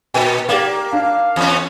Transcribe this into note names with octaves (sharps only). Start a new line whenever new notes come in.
A#2 B4 G5 G#5
A#3 G4 D5 F5
D4 F5
E2 C#4